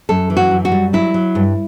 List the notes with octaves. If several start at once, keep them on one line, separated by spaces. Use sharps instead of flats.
F#2 A4
E3
F#4
F#2
F#4
G3
F#3 E4
F#3
G2